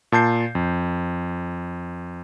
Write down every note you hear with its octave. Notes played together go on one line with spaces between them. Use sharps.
A#2 A5 G6 C7
F2